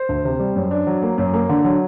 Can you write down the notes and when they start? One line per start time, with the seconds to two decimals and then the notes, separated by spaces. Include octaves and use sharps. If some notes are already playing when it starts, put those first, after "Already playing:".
Already playing: C5
0.09 D2
0.25 C3
0.39 G3
0.56 F#2
0.71 D4
0.87 F#3
1.02 A#3
1.18 F#2
1.33 A#3
1.49 D3
1.64 F#3